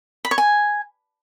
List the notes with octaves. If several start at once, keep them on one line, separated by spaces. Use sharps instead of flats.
B5
C#5
G#5